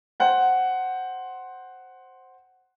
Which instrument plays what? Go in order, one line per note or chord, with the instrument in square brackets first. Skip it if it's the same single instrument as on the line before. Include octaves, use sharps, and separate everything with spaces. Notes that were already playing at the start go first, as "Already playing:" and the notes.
[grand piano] C5 F#5 G5